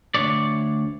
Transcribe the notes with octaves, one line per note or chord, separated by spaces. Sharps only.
D2 G2 D4 C#5 D5